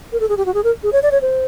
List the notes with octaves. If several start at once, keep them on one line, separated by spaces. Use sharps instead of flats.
A#4
A4
G#4
G4
F#4
G#4
A#4
G#4
C#5
D5
C#5
C5